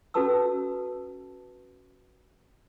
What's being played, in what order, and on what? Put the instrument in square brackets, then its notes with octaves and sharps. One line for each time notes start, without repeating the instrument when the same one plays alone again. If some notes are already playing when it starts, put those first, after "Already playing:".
[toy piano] C#4 F#4 A4 B4 A5 E6